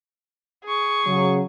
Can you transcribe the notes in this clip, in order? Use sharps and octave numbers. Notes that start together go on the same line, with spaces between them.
G#4 C#6
C#3 F#3